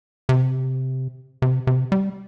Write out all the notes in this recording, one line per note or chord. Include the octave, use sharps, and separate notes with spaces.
C3
C3
C3
G3